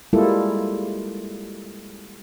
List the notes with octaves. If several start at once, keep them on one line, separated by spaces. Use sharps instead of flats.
G3 G#3 A#3 E4 F4 A4